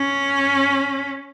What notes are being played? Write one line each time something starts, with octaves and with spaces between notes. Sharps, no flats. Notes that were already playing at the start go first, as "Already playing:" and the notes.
Already playing: C#4